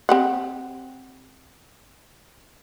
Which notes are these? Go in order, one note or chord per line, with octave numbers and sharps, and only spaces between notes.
C4 G4 F#5